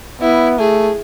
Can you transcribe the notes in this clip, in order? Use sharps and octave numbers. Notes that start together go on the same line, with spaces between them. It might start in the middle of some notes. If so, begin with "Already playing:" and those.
B3 E4
A3 G#4